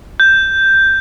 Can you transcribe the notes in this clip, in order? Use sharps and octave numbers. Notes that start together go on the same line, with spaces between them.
G6